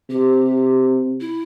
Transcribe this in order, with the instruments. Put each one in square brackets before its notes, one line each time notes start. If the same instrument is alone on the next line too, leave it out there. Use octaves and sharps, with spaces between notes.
[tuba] C3 [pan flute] G4
[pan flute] E4